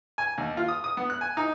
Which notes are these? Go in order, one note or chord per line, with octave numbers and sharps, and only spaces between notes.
G#5
D#2
F4
D#6
D#6
B3
F#6
G#5
D#4